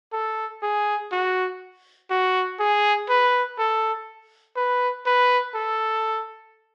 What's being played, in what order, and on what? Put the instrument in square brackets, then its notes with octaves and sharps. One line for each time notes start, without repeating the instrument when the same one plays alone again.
[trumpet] A4
G#4
F#4
F#4
G#4
B4
A4
B4
B4
A4